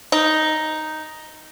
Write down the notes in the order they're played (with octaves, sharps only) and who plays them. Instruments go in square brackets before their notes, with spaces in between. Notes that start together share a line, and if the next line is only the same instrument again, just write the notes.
[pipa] D#4